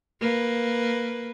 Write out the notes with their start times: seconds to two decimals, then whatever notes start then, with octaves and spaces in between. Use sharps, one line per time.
0.20 A#3 B4